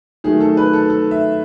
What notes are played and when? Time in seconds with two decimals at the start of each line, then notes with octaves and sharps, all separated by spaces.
0.24 D#3 F#3 A3 G#4
0.40 A4
0.57 B4
0.73 A4
0.89 A4
1.11 E5